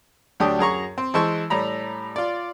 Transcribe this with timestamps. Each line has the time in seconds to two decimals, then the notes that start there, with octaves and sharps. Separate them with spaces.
0.40 D2 F#3 D4 G4 D#6
0.59 F#2 G#4 A#5 C#6
0.98 C4
1.14 E3 G#3 C5 A5 C#6 E6
1.50 A2 G3 A#5 B5
2.16 F4 D5